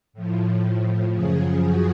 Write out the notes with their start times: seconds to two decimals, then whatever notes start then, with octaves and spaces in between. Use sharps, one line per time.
0.13 A2 F3
1.13 F#2 C#3 F3 G#4
1.63 F#4